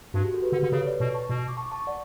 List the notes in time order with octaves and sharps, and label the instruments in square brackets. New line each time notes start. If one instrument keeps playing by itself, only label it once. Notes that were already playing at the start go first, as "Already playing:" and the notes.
[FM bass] G2 [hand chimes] F#4
[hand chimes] G4
F#4 A4
G4 B4
[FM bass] D3
[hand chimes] G4 B4
[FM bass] D3
[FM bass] C#3 [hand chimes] A4 C#5
[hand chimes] B4 D5
[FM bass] B2
[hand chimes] A5 C#6
[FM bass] B2
[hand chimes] D6
A5 C#6
A5 C#6
D5 F#5